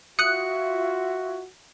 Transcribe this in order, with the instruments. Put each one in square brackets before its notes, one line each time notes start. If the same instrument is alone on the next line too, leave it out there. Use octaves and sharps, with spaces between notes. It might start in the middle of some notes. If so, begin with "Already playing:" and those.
[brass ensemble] F4 F#4 [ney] E5 [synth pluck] D#6 F#6 [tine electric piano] C#7